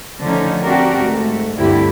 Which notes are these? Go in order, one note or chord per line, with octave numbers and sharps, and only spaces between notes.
D3 F3 A3 C#4 D#4
C4 D4 F#4 G4 A#4
G#2 A3
D2 G2 D3 C4 E4 G4